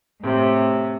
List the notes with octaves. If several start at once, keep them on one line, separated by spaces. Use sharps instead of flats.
A2 C3